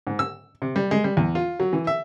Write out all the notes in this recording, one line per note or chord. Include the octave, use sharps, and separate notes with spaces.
G#2
E6
C3
G3
G#3
G3
E2
F4
F#3
E3
E5